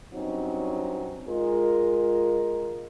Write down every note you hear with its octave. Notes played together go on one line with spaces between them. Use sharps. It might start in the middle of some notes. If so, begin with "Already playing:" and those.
G2 F#3 C4 C#4 D#4
G#3 F4 A#4